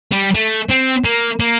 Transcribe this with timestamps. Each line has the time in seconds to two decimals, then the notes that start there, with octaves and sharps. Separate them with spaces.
0.12 G3
0.35 A3
0.69 C4
1.05 A#3
1.40 A#3